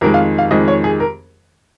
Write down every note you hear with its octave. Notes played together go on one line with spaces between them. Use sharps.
F2 D#3 G#3 A#4
F5
F5
F2 D#3 G#3 D#5
C#5
G#4
A#4